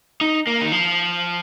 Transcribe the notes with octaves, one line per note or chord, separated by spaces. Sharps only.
D#4
A#3
D#3
F3